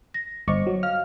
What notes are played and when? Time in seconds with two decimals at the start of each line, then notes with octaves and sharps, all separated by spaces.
0.14 A#6
0.48 G1 C5 D#5 C#6 D6
0.67 F#3
0.83 F5 F6